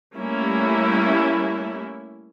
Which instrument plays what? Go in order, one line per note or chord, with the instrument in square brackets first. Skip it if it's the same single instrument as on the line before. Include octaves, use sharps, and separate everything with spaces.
[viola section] G3 A3 A#3 C#4 E4